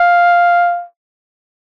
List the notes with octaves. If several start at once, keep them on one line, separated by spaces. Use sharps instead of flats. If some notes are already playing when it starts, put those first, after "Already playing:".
Already playing: F5